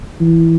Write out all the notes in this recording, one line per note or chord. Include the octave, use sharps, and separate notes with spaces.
E3